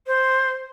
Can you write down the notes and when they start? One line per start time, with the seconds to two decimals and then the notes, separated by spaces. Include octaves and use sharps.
0.06 C5